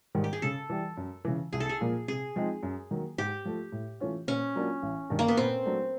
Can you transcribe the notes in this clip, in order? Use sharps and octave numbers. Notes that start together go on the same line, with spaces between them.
G#2 D#3 G3
G4
G#4
C#3 A4
E3 G3
F#2
C#3 E3
C2 G#4
A4
G#4
A#2 F3 A#3
C3 G#4
F3 G#3 C4 D#4
F#2
D#3 F#3 A#3
G#2 G4
F3 A3
A2
E3 A3 C#4 F4
A#2 C#4
F#3 A#3 D4 F4
A1
G2 D#3
A#3
B3
A#2 C4
F#3 A3 D4